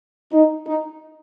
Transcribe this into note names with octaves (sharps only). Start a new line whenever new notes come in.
D#4
D#4